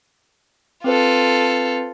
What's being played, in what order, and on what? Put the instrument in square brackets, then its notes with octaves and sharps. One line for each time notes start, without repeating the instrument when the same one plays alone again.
[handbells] C4 B4 C5 [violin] F4 A4